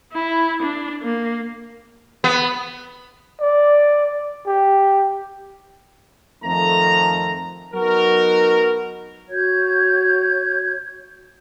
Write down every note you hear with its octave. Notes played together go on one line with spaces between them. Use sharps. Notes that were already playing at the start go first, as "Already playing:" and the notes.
E4
D4
A#3
B3
D5
G4
F2 D#3 F3 A3 A4 A#5
F#3 B3 D#4 F#4 A#4
F#4 C#5 G6 G#6